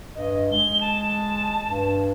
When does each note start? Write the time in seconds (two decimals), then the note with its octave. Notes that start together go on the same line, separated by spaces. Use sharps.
0.15 G2 D#5
0.51 G#3 G7
0.81 A5
1.67 G2